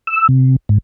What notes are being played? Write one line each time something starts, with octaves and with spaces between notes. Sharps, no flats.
E6
C3
G#2